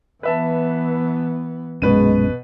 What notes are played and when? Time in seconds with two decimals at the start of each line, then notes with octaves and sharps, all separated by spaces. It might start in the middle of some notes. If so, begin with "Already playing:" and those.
0.23 E3 B3 B4 E5 A5
1.82 A#1 F#2 B2 G#3 C#4 B4 D#7